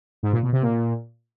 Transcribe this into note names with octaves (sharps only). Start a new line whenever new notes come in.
G#2
A#2
B2
C3
A#2